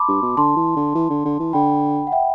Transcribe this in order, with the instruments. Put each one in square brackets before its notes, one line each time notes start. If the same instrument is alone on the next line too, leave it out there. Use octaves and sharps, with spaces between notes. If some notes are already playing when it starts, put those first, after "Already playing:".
Already playing: [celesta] A5 B5 C6 D6
[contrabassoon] G2
B2
[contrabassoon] D3 [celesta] A5 C6
[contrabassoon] E3
D3
E3
D3
D3
E3
[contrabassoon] D3 [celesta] G5 B5
[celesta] F#5
E5 G5